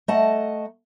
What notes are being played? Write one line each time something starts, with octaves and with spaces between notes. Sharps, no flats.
A3 D#5 F#5 A5 A#5